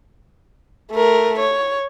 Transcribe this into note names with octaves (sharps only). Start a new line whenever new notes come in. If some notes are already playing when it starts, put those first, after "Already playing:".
A3 A#4
C#5